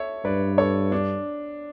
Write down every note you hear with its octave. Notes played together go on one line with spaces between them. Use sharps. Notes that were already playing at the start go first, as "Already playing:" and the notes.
Already playing: A4 C#5 E5
G2 B4 D5
A4 C#5
D4